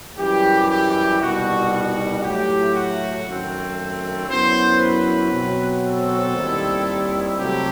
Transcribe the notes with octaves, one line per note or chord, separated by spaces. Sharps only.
F#2 E3 G3 G4
G4
C2 B2 G3 D#4 F#4
F#4
A2 F#3 A3 E4 G4
F#4
F#2 D#3 A3 C4
F#2 F#3 B3 E4 C5
B4
B2 F#3 C4
A4
D#2 D#3 G3 C4 E4
C2 C3 F#3 A3 E4 G4